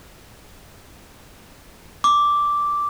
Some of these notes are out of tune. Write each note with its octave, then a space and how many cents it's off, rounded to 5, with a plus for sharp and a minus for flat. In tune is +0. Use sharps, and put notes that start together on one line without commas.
D6 -5